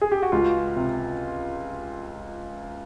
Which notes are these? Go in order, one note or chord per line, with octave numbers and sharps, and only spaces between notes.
G#4
G4
F#4
C#2 F4
C3